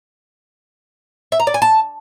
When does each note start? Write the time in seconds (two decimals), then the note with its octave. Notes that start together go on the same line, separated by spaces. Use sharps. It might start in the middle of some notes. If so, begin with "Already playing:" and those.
1.32 E5
1.39 A#5
1.47 D5
1.54 G#5
1.62 A5